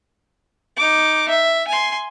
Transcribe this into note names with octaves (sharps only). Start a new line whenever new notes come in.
D#4 D6
E5
G#5 C6